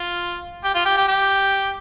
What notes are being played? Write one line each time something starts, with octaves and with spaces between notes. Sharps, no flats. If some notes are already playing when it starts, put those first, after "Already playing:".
Already playing: F4
G4
F4
G4
G4
G4